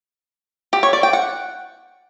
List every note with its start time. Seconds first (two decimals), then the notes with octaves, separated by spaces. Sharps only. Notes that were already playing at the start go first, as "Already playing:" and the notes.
0.73 G4
0.83 C#5
0.93 D5
1.03 G5
1.13 F#5